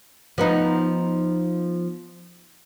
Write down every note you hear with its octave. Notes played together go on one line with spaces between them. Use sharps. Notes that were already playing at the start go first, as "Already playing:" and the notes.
F3 B3 D#4